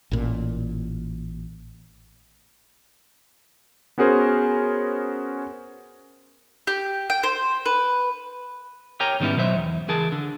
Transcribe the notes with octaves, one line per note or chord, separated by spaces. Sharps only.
A1 A#2
B3 C#4 F#4 G#4 A#4 C5
G4
G5
C5
B4
G4 A#4 C#5 G5 G#5 A#5
G#2 D#3 G3 B3 C#4 E4
B2 F#3 C5 E5
E2
C#2 E3 G#4 A#4 A5
D3